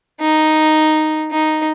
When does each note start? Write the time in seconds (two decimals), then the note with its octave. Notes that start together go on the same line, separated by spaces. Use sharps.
0.21 D#4
1.31 D#4